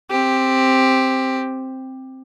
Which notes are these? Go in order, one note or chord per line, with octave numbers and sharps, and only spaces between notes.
C4 G4